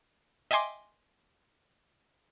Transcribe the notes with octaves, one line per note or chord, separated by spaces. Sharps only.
D#5 E5 G5 G#5 C6 D6